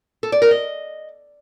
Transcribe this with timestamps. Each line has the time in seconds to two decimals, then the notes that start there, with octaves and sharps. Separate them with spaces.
0.23 A4
0.32 D5
0.42 A#4
0.51 D#5